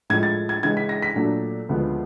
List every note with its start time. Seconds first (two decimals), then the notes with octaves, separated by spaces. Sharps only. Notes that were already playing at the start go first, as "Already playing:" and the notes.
0.10 A2 F3 G#3 G#6
0.23 A6
0.49 G#6
0.63 C#3 E3 G#3 G#6
0.77 B6
0.89 A#6
1.02 B6
1.16 A#2 F#3 A3 D4
1.69 D2 C#3 F3 G#3 B3